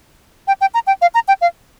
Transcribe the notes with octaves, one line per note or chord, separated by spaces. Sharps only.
G5
G5
A#5
G5
F5
A#5
G5
F5